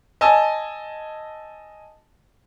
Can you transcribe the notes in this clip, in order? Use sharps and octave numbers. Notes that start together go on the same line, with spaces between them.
D#5 G#5 A5 E6